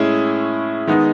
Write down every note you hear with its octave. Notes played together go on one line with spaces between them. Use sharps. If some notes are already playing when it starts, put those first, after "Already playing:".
Already playing: A2 G#3 C#4 E4 G#4
D#3 G#3 B3 D#4